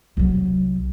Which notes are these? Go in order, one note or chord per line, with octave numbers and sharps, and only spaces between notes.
C2 F#3